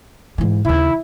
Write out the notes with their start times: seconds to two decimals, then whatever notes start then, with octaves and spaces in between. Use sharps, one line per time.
0.38 G#2 E3
0.65 D#2 C#3 E4